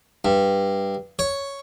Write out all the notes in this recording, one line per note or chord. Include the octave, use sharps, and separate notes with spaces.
G2
C#5